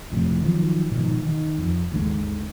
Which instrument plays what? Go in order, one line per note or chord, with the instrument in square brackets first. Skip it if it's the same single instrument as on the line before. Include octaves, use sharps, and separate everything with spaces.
[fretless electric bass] G1 F2 A2 C3
D#3 F3 F#3
G#2 B2 D#3 F3
D#3
F2
G#1 D#2 D3 G#3